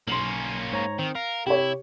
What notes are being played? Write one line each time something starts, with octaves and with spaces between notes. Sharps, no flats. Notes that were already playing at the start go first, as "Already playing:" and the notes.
B1 A#3 C#4 C6 F#7
G#2 C#5 A#5
D#3 C4
A#4 F5
C3 E4 G4 C#5